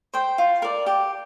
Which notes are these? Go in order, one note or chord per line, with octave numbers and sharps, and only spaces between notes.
C5 G5
F4
A#4 D5
G4